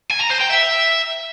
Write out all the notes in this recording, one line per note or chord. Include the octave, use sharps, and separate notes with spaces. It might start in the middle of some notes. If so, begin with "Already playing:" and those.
G#5
A#5
C5
G5
E5